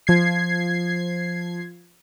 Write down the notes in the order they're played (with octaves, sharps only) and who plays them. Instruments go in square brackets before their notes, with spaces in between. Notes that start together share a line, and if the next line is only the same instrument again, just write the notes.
[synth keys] F3 G#6 C7